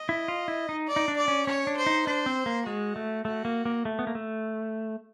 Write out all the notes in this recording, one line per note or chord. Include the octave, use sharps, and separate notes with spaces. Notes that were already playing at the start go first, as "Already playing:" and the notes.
Already playing: D#5
E4
F4
E4
D#4
D5
D#4
D4
D5
C#4
C#4 C#5
D4
C5
D#4
D4 C5
C4
A#3
G#3 F#4
A3
A3 F#4
A#3
A#3
A3
B3
A#3
A3